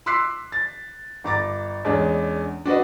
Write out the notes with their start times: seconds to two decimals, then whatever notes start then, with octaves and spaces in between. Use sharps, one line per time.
0.06 C6 D6 E6 F#6 B6 C7
0.52 A6
1.24 G1 A#5 D6 A6
1.85 E2 G#3 C#4 D4
2.66 D4 F#4 B4 D#5